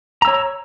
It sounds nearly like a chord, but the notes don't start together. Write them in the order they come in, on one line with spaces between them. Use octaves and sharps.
A#5 E6 C#5